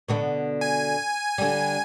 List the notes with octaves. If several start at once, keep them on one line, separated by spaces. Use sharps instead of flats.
B2 D3 B3
G#5
D3 G3